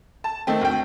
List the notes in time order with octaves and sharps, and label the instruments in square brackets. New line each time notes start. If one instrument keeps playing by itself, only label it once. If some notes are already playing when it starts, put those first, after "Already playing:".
[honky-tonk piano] A5
D#3 A3 C4
D2 G5